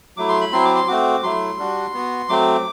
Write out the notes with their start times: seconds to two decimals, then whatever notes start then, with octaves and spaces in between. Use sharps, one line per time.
0.17 F#3 A3 E4 D6
0.29 C6
0.41 B5
0.53 F#3 C4 E4 C6
0.65 D6
0.75 C6
0.88 A3 C4 F#4 D6
1.23 F#3 A3 E4 C6
1.59 G3 D4 F#4
1.94 B3 F#4
2.29 F#3 A3 C4 D6